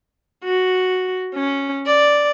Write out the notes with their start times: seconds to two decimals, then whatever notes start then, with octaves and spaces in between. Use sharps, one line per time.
0.44 F#4
1.35 C#4
1.87 D5